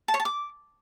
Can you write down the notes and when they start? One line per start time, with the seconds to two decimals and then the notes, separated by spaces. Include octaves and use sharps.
0.08 A5
0.14 C#5
0.20 A5
0.25 D6